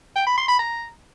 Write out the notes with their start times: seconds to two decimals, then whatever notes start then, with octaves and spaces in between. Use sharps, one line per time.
0.16 G5
0.27 B5
0.38 C6
0.48 B5
0.59 A#5